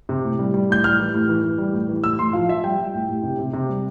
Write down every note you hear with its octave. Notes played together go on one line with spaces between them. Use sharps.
C3
A2
G3
G3
A2 G6
G3 F6
E3
A2
E3
E3
G3
A2
E3
A2 E6
A2 C6
F3 F5
F3 E5
G3 G5
G3
A2
A2
C3
C3
C3
G3